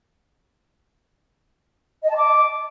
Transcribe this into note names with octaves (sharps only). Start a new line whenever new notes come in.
D#5
A5
D6